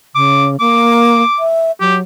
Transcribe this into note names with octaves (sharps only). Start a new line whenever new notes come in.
C#3 D6
A#3 D6
E5
F#3 G4